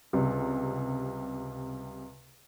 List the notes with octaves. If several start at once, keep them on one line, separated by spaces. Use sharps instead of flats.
C#2 C3 G3